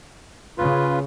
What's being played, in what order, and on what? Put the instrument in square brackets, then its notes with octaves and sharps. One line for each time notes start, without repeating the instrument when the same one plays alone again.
[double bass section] C#3 [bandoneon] F4 B4